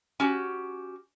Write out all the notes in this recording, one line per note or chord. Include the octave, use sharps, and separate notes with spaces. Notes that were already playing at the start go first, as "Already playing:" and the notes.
C#4 F#4 G4